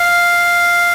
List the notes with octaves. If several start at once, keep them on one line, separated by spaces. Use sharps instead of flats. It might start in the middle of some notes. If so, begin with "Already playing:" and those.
Already playing: F5